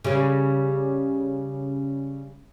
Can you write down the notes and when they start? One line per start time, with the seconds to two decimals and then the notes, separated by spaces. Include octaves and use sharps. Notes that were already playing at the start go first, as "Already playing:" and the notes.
0.04 C#3 G3 C#4